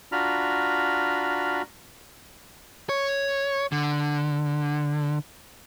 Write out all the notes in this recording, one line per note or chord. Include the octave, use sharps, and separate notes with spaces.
D4 F4 F#4 A#5 B5 F6
C#5
D3